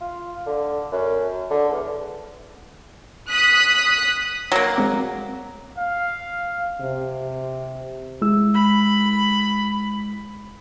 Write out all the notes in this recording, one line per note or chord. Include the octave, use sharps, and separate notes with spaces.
F4
D3
F#2
D3
E2
D#6 F#6 B6
F#3 A#3
G#3 C4 D6
F5
C3
G#3 E4 E6
B5